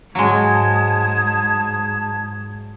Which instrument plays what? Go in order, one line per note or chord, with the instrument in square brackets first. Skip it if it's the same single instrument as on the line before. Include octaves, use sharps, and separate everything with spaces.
[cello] G#2 [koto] F#3 G#3 [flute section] A5 D#6 G#6